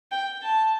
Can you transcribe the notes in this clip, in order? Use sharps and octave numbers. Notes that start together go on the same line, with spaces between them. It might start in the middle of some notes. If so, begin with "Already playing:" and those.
G5
A5